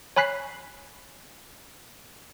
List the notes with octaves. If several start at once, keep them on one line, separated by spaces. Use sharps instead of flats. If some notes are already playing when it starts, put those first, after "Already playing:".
C#5 G#5 B5 F#6 B6 C7